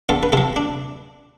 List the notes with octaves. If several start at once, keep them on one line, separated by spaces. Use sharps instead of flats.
E2 F4 A4
B4
C3 F3 F4 A4
D4